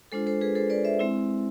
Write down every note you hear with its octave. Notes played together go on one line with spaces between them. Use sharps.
G#3 D4 F4 A4 C5
A4 C5
G#4 B4
A4 C5
B4 D5
C5 E5
G#3 C4 E4